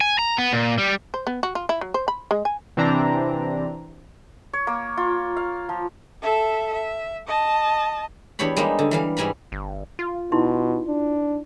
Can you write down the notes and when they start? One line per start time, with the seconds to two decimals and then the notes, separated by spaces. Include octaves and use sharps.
0.01 G#5
0.19 A#5
0.38 B3
0.53 A#2
0.78 G3
1.14 C5
1.27 B3
1.43 F#4
1.55 F4
1.69 E4
1.81 F#3
1.94 C5
2.08 B5
2.31 G#3
2.45 G#5
2.77 C3 E3 C4 D4 A#5
4.53 C#5
4.67 A#3
4.97 F4
5.37 F5
5.69 F3
6.22 A4 E5
6.73 E5
7.27 D#5 A5
8.39 E2 D4 G4 C#5 B5
8.57 G3 G#3 A#3 D#4
8.79 D3
8.91 E3 G3 F5
9.17 G#2 G3 G#5 A#5 B5
9.52 G1
9.99 F4
10.32 B2 D#4 E4 C6
10.88 D4